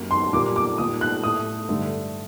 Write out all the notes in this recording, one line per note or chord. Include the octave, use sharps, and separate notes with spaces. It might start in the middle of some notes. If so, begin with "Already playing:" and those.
Already playing: F#2 F#3 A#3
C6
C6
A#2 G3 A#3 D6
D6
A#2 G3 A#3 D#6
F#6
A2 A3 D#6
G2 D3 A3